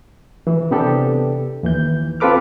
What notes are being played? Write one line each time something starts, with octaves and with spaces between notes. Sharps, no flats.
E3
C3 B3 D4 G4 A4
D#2 E3 G6
C4 F4 A4 B4 D6 F6